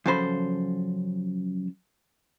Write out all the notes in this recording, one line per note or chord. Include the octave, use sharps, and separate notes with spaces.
F#2 C#3 F3 A4 C5 B5